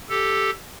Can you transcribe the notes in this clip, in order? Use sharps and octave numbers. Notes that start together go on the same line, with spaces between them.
G4 A4